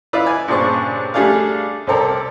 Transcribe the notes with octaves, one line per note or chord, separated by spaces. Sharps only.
E4 F4 B4 D5 D#5
G#5
G2 A#2 C#3 D4 C5 C#6
G3 A3 D4 G#4 D5 F5
C2 C4 A4 A#4 D5